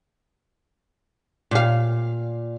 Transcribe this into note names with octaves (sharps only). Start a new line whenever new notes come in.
A#2 F5